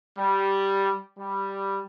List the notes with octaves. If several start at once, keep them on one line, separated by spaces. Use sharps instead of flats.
G3
G3